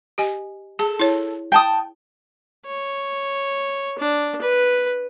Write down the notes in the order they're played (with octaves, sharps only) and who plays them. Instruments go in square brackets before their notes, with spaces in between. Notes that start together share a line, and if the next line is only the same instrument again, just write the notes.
[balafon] G4 D#5 G#5
[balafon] G#4 [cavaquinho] A4
[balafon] E4 C#5
[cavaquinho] G5 A5 D#6
[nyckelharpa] C#5
D4
B4